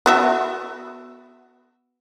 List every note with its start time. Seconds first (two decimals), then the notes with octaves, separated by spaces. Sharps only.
0.06 B3 F#4 E5